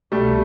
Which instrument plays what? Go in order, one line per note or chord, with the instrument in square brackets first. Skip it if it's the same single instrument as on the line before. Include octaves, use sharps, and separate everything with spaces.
[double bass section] C2 B2 [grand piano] G3 A3